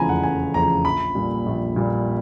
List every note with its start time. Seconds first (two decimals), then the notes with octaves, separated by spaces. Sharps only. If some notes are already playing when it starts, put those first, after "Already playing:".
Already playing: F1 E2 C#3 F3 A3 G#5 A#5 B5
0.09 F#5
0.23 F1 G#5
0.54 E2 C#3 F3 A3 A#5
0.85 A#1 B5
1.15 A#2 G3
1.46 A#1
1.76 A#2 G3